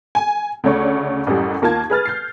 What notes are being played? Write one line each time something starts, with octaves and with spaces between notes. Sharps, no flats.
G#5
D2 C#3 A3 C#5 D5 C#6
A1 F#2 A2 G3
D#2 A#3 F4 A5 G#6
G#4 B4 F6 A6
G6 C7